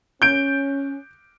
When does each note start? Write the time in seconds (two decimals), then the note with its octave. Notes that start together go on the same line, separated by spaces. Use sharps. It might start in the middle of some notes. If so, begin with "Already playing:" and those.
0.22 C#4 G6 D7